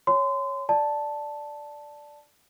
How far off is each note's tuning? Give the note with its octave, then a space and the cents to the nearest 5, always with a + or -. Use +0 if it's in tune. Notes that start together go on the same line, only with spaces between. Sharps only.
C#5 +0 G#5 +0 C6 -30
D5 +0 A5 +0